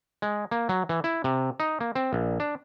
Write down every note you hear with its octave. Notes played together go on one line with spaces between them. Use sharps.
G#3
A#3
F#3
E3
E4
C3
D#4
A#3
C4
A#1
D4